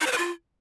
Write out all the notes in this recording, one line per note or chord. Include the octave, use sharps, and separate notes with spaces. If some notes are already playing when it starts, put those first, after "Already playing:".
D#4
C5
B4
F4